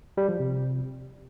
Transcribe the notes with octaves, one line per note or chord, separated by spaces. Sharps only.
G3
F3
C3